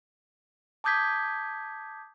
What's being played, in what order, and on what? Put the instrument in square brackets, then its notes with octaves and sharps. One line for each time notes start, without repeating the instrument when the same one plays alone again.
[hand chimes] A5 D6 D#6 G6 G#6 B6